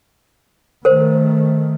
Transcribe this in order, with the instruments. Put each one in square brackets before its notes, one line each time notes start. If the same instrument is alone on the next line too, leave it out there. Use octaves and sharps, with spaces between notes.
[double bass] D#3 A3 [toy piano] A#4 C5